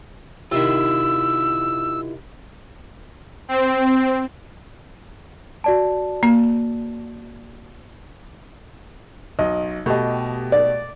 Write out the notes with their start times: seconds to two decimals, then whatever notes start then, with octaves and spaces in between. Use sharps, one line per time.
0.51 C3 D#3 E4 F4 E6
3.48 C4
5.64 F#4 D5 A5
6.23 A#3
9.39 B1 D#5
9.86 B2 A3 G4 D#5
10.52 D5